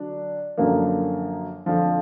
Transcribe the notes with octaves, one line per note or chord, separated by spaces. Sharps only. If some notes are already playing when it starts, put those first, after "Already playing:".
Already playing: D3 F#3 D4
F#2 D3 F3 A#3
F2 D3 F3